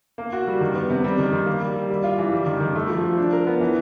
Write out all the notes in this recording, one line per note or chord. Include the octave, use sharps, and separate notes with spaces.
A#3
F#4
G3
D#3
B3
C3
G3
D#3
D#3
A#3
G3
G3
G3
F4
E3
G3
D#3
D#3
A3
F3
F3
D4
A#4
B3
E3